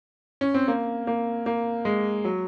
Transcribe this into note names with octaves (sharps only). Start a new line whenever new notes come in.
C#4
C4
A#3
A#3
A#3
G#3
F#3